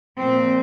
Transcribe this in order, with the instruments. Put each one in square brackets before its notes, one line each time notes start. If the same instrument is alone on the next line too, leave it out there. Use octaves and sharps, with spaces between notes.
[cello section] A#2 F3 C4